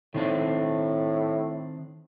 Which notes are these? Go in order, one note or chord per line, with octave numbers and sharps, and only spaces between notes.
A2 D#3 C4 D4